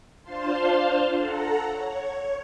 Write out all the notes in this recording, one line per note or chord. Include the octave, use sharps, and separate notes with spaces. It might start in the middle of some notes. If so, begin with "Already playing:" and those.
D4 F4 C5 F5 A5 C6
A4 F#5 A#5
C#5